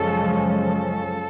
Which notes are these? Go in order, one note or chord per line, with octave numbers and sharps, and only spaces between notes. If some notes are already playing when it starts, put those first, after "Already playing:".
Already playing: F#2 C#3 F3 G#3 C#4 A4
A4